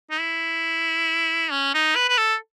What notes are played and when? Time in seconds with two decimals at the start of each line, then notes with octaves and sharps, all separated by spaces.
0.11 D#4
0.20 E4
1.51 C#4
1.74 D#4
1.96 B4
2.09 B4
2.17 A4